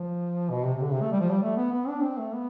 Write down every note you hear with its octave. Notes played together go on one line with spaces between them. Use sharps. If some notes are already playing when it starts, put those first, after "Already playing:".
Already playing: F3
B2
C3
C3
D3
C3
A3
G3
F3
G3
A3
B3
B3
D4
C4
A3
B3